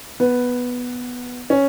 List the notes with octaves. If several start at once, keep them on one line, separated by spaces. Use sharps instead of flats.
B3
C#4